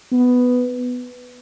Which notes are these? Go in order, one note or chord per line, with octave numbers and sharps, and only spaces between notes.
B3